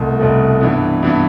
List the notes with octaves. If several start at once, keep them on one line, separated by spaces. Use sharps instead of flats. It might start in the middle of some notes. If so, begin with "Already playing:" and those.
Already playing: C2 B2 A3
C2 B2 A3
G2 E3 B3
G2 E3 B3